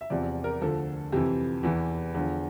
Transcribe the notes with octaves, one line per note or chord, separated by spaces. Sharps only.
E5
E2 C3 F3 D5
A#4
D2 D3 F3 A4
F2 C3 E3 G4
E2 E3
E2 D3 F3